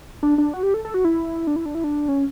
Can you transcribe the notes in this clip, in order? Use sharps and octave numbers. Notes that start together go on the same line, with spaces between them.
D4
D4
F#4
G4
A4
A4
F#4
E4
D4
E4
D4
E4
D4
C#4